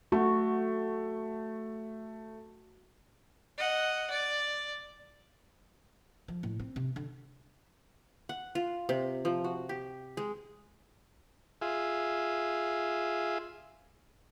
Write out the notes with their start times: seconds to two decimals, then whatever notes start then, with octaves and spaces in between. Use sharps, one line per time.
0.12 A3 F#4
3.58 D#5 F#5
4.10 D5
6.28 F3
6.43 A2
6.59 C4
6.76 C3
6.96 D3
8.29 F#5
8.55 F4
8.89 C3
9.25 F3
9.44 F#4
9.69 G4
10.17 G#3
11.61 F4 G#4 E5